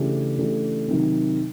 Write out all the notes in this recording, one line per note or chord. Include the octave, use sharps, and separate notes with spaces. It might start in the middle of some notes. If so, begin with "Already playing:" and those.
Already playing: C#3 E3 A3 D4 G4
C#3 E3 A3 D4 G4
C3 D#3 F#3